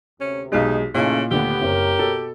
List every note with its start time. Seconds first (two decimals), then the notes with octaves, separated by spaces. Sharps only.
0.21 D2 C3 C#4
0.52 B1 G#3 D#4 G4
0.94 A#2 C#3 F3 A3 A#3 C#4 D#4 E4
1.31 D#2 D3 A3 B3 D4 G4
1.62 F#1 C4 A#4 C5 C#5
1.99 B2 A4